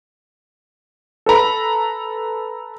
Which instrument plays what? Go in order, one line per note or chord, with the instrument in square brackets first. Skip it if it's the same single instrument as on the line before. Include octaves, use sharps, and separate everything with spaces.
[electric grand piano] A4 B4 A#5 B5